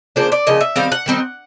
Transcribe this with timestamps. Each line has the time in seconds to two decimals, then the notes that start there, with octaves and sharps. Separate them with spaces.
0.16 C#3 F3 A#3 D4 C5
0.32 D5
0.47 C#3 F3 A#3 D#5
0.61 E5
0.76 D#3 G3 C4 F5
0.92 F#5
1.06 D#3 G3 C4 D#4